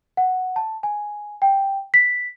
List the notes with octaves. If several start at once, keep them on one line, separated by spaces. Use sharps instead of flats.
F#5
A5
G#5
G5
B6